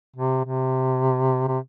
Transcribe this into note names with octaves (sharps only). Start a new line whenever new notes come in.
C3
C3
C3